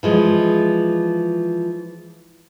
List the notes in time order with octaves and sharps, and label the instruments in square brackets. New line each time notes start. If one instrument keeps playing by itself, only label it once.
[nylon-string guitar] E3 F3 G#3